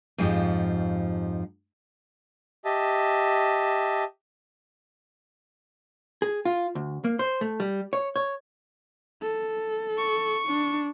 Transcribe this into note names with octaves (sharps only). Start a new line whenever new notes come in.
F2 G#2 F3 G4
G4 D#5 E5 A5
G#4
F4
D2
A#3
C5
A3
G3
C#5
C#5
A4
C#6
D4